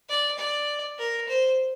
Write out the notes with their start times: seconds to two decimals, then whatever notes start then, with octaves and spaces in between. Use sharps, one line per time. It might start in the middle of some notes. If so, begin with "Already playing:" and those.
0.09 D5
0.38 D5
0.98 A#4
1.28 C5